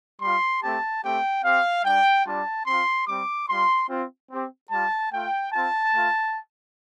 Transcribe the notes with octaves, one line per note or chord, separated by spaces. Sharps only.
G3 F4 C6
A3 C4 G4 A5
A3 C4 G4 G5
C4 G4 F5
G3 D4 G4 G5
G3 D4 F4 A5
C4 F4 C6
G3 C4 G4 D6
G3 F4 C6
C4 F4
C4 G4
G3 F4 A5
A3 F4 G5
C4 F4 A5
A3 F4